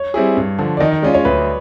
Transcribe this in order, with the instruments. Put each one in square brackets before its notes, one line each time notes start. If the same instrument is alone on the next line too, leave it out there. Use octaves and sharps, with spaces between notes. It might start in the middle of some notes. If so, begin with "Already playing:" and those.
Already playing: [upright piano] C#5
[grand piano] G3 C4 E4 G#4
G2
D3 F3
[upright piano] D5
[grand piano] D#3 [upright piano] D#5
[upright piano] D#5
[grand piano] G#3 C#4 F4 [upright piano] D5
[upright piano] C#5
[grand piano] D2 [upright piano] B4